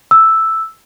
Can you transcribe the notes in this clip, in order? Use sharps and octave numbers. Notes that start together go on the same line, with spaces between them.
E6